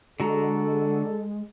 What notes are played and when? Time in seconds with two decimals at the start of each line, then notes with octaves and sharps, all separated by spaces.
0.20 D3 G#3 F#4 A4 A#5